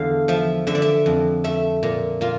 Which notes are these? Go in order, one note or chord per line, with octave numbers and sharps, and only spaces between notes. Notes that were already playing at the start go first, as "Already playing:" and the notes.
Already playing: E2 D3 F5
F3 E5
D3 E5
D5
E5
F2
A3 E5
A#2
A#2 F4